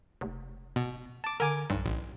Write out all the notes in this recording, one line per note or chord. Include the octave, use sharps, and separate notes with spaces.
F1
B2
A5 D6
D3 A#4 G#5 D6
B1 G2
A1